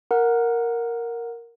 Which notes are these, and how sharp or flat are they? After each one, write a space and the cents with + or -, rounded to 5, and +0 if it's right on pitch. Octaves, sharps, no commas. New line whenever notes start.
A#4 +0 F#5 -15